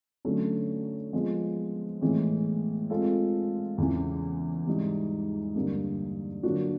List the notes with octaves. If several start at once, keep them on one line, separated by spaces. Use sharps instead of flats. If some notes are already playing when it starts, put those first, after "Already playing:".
D3 F#3 A3 C#4
F3 G#3 B3
A2 E3 G#3 B3
G#3 C4 F4 A4
E2 C#3 E3
G#2 E3 G3
G2 D3 G3 A#3
D3 F#3 A#3 D4 F#4